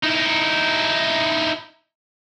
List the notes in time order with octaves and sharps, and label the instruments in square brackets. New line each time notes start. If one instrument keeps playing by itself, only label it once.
[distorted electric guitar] D#4 E4